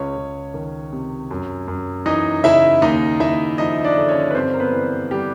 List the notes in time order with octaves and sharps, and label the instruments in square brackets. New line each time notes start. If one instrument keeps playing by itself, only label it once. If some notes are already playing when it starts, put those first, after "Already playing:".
Already playing: [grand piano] C#2 C#4 C#5
C#2
D#3
C3
F#2
F#2
E3 D#4 D#5
C#3 E4 E5
D#2 D#4 D#5
D#2 E4 E5
F3 D#4 D#5
D4 D5
D3
C#4 C#5
B4
G2 C4 C5
A#4
B3 B4
E3
G3 G4